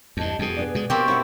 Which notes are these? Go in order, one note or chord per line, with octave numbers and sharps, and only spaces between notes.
E2 G2 D#5 A5
F2 B2 G3 G#4
B3 D4 D5
B2 G#3
B2 A#3 C4 G4 G5 C#6
C#4 E4 C#5 F#5